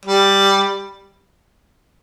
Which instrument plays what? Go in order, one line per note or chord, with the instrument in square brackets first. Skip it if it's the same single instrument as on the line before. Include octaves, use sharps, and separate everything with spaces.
[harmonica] G3